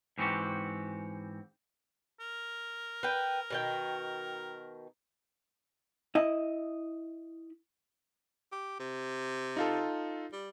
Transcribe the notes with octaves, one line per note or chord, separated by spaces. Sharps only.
G#2 E3 C4 D4 F#4 G4
A#4
B4 G5
B2 D#3 G5
E4 D#5
G4
C3
D#4 F4 A4
G3